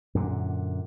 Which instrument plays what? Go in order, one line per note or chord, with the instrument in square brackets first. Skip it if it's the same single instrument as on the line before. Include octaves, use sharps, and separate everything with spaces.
[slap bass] F#2 A#2 D3